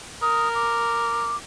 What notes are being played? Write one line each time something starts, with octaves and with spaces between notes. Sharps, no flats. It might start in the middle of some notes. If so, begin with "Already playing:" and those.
A#4 D#6
D6